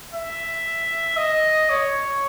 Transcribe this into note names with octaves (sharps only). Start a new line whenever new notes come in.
E5
D#5
C#5